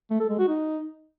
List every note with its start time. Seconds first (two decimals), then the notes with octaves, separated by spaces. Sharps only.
0.10 A3
0.20 A4
0.29 G#3
0.39 F#4
0.48 D#4